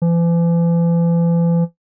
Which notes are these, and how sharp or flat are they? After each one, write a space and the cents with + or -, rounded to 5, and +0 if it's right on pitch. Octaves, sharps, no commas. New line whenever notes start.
E3 +45